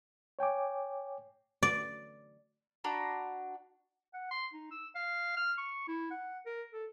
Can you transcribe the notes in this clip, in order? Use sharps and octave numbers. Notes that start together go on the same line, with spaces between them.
C#5 G5 G#5 D6
D5
D4 F#4 A#5 B5
F#5
C6
D#4
E6
F5
F6
C#6
E4
F#5
A#4
A4